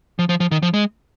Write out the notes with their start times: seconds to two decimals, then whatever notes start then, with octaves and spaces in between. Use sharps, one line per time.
0.19 F3
0.29 F3
0.40 F3
0.51 D#3
0.63 F3
0.74 G#3